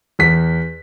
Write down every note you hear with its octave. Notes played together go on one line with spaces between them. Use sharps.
E2 B6